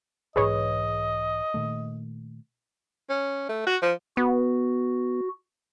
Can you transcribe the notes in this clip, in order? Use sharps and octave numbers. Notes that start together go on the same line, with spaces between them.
B1 G#2 E3 G#4 B4 C#5 D#5
A#2 D#3 A3
C#4
A3
F#4
F3
B3 F#4